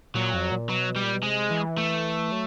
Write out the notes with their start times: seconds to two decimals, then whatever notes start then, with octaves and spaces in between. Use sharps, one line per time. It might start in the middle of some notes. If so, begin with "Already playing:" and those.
0.15 A#2 F#3
0.34 F2
0.51 A#2
0.69 B2 F#3
0.96 G3
1.03 A#2
1.13 B2
1.23 C3 G#3
1.51 E3
1.78 A3
2.32 F#3